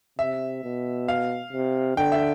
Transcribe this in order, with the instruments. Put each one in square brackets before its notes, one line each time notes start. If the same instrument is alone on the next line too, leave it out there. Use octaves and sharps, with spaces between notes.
[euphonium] C3 [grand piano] E5
[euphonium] B2
[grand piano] F5
[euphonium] C3
[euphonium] D3 [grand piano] G5
[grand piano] E5